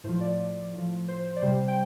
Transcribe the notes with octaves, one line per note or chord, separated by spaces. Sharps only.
A2 F3 C5
D5
A2 F3
C5
D5
C3 G3 C5
G5